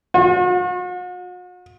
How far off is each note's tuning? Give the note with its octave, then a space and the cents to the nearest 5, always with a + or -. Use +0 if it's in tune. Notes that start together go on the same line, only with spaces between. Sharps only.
F#4 -45